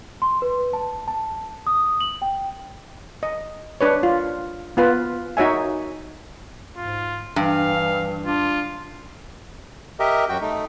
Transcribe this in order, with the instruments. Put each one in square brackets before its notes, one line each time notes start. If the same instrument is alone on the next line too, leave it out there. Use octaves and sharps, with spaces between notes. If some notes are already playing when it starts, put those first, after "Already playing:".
[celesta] C6
B4
A5
A5
D#6
F#7
G5
[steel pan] D#5
D4 B4 C#5
F4
B3 F4 B4
D#4 F#4 C#5 E5 G#5
[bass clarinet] G#2 [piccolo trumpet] F4
[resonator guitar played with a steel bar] G2 [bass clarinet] E3 [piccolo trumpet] F5
[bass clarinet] D4 [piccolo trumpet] F4
[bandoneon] G4 A#4 D#5 E5
F#2 F#4 G5
A3 D#4